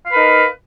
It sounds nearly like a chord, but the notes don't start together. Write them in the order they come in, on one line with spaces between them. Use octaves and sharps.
F5 B4 A#4 D#4